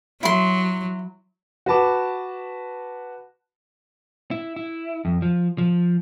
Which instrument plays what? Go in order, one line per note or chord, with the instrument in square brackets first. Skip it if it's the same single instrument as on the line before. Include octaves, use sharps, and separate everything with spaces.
[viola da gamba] F#3 [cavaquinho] E4 C6
[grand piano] F#4 B4 A5 D6
[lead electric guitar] E4
E4
F2
F3
F3